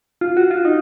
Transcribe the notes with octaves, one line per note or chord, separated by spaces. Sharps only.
F4
F#4
F4
D#4